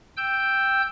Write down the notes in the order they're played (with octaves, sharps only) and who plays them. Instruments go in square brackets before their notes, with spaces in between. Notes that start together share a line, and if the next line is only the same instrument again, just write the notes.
[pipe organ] G5 E6 G6